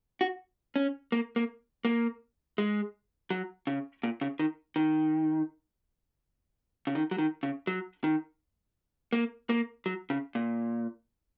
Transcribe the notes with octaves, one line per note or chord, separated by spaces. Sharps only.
F#4
C#4
A#3
A#3
A#3
G#3
F#3
C#3
A#2
C#3
D#3
D#3
C#3
D#3
F#3
D#3
C#3
F#3
D#3
A#3
A#3
F#3
C#3
A#2